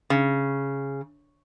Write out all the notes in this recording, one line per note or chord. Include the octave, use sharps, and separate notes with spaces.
C#3